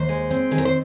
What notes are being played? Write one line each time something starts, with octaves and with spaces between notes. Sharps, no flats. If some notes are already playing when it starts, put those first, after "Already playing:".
Already playing: D#2 C5
G#3
C4
D#3 G#4
A#4
C5